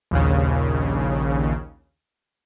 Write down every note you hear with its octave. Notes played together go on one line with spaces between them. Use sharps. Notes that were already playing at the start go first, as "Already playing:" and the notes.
A#1 D#2 C#3